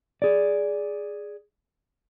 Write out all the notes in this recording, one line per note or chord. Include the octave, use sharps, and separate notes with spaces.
G#4 D5